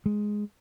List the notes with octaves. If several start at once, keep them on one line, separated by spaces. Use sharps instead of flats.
G#3